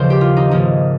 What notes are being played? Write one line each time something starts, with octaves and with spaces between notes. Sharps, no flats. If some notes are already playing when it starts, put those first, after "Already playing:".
Already playing: D#2 C#3 F3 C5
G4
F4
D#4
G#1 G#2 F3 A#3 C#4 D#4